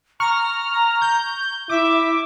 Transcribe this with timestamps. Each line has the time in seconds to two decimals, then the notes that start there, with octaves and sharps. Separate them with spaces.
0.20 A#5 C#6 F6
1.02 G6
1.70 E4 E5 D6